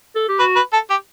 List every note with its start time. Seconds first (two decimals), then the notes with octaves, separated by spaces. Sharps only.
0.15 A4
0.28 G4
0.39 F#4 B4
0.56 B4
0.73 A4
0.90 G4